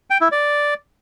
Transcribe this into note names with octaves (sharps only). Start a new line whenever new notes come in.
G5
E4
D5